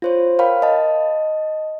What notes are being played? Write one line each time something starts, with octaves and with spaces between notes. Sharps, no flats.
F4 C5 C#5
A#4 C#5 F5 G5 B5
D#5 A5